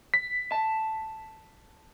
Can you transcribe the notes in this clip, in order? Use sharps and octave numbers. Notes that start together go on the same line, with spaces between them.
B6
A5